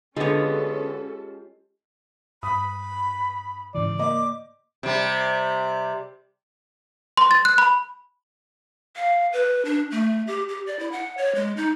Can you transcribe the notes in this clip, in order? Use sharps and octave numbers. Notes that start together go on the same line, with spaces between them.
D3 G#3 B3 C#4 F4 G4 A4 C#5
G2 B5 D#6
G#2 C#3 E3 D5
A#3 D#5 D6
C3 G3
C6
A6
F#6
B5
F5
B4
D4
A3
G4
G4
D5
E4
F#5
C#5
G#3
D#4